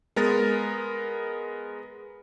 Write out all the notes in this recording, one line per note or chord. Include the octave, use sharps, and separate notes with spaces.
G#3 B3 A#4 A6